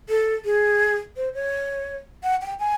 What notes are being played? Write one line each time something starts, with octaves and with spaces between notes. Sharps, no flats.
A4
G#4
C5
C#5
F#5
G5
G#5